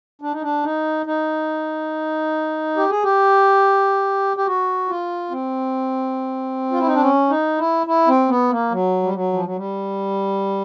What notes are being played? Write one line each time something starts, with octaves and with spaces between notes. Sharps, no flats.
D4
D#4
D4
D#4
D#4
G4
G#4
G4
G4
F#4
F4
C4
F4
E4
D#4
D4
C#4
D#4
E4
E4
C4
B3
A#3
F#3
G3
F#3
F3
F#3
G3